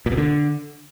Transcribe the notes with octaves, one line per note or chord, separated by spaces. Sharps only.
A#2
B2
D3